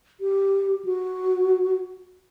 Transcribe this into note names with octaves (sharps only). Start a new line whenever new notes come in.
G4
F#4